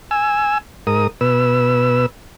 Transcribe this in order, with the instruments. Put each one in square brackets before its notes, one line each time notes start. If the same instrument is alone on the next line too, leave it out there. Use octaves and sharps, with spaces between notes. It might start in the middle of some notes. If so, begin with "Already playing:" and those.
[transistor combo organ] G#5 E6
G#2 A#4 D#6
B2 B4 E6